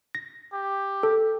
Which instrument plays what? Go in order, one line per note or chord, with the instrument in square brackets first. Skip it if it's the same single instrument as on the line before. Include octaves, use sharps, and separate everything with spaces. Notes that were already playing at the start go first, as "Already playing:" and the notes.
[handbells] A#6
[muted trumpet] G4
[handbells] A4